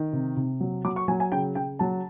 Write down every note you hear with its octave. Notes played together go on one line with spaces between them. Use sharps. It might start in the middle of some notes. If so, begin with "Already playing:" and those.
Already playing: D#3
C3
C3
F#3
F#3 D6
C#6
F#3 G#5
G#5
C#3 G5
C#3 G5
F#3 A5